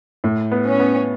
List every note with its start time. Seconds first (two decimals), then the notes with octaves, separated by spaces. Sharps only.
0.24 A2
0.51 B3
0.65 C#4
0.79 B3